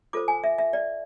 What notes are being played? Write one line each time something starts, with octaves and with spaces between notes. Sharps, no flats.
F4 A4 C5 D6
G#5
E5
E5
D5